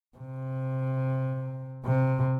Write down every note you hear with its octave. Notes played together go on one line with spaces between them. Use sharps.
C3
C3